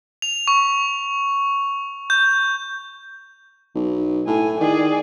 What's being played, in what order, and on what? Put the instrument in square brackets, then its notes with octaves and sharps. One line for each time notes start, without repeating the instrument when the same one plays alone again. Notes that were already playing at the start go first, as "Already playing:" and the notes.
[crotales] F7
C#6
G6
[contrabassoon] B1
[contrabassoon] A2 [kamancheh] G#5
[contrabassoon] D#3 [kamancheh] G#4 D5